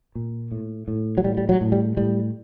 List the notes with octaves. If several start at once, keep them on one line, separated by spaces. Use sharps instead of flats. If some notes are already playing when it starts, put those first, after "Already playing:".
A#2
A2
A2
F#3
A2 G3
G3
F#3
A2
G3
A2 G3